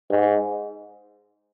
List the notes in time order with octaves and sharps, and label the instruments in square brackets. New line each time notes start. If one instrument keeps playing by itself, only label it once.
[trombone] G#2